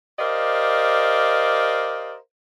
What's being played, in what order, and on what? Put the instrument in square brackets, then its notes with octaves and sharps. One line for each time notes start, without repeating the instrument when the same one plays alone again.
[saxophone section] G4 A#4 C5 D5 D#5 F5